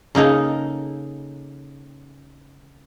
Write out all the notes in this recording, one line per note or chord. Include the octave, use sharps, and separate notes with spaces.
C#3 A#3 D#4 A4